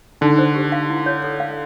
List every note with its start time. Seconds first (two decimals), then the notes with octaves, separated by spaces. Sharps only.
0.21 D3 D#4
0.39 C5
0.55 G4
0.72 F5
0.90 E4
1.06 C#5
1.24 A4
1.40 F5